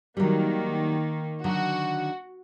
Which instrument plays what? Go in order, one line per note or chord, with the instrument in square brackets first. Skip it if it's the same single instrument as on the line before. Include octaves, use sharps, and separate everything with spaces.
[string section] D#3 A#3 [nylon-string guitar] F#3 G3
[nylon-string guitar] D3 D#3 F#3 [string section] F#4